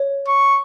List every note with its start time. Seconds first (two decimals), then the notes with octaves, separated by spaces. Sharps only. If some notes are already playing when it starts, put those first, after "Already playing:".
Already playing: C#5
0.28 C#6